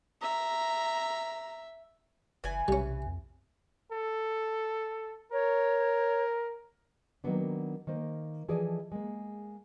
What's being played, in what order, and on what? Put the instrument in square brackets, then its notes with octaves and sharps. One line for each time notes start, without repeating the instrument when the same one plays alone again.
[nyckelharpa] E5 [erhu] A#5
[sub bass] F#1 [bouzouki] E3 G#5
[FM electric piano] B1 [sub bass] C3 [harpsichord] G3 C#4
[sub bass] F2
[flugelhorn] A4
[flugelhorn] A#4 [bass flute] C#5
[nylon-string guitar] D#3 F#3 A#3 B3 D4
D#3 A#3 C5
E3 F3 G#4 A4 D5 D#5
G#3 A#3